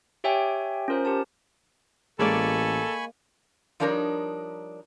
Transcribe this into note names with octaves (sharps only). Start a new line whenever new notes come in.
G4 C#5 E5 G5 G#5
C#4 F4 A#4 C5
G4 A#4 A5
A1 G#3 A#3 A4 D5 G#5 B5 C#6
F3 G3 D4 D#4 A#4 C#5